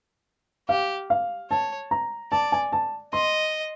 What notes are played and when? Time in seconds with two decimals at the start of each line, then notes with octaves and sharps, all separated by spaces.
0.69 G4 F5
1.10 F5
1.50 C#5 A5
1.91 A#5
2.32 D5 A5
2.52 G#5
2.72 A5
3.13 D#5 C6